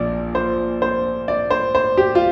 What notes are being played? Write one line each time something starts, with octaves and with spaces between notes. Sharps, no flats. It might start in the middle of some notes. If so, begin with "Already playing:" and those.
Already playing: A#1 A#2 F3 D5
C5
C5
D5
C5
C5
G4
F4